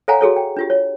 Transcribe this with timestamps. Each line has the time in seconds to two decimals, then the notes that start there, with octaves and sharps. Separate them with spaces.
0.08 A4 C#5 F5 F#5 G#5 A#5
0.21 F#4 G#4 A4 C#5
0.36 G5
0.56 D4 F4 G4
0.70 C#5